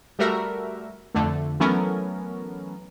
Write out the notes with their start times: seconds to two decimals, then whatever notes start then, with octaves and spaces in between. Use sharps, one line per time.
0.19 G3 A3 F#4 A#4 E5
1.15 F2 D3 A3
1.60 E3 F#3 A3 B3 C#4 A#4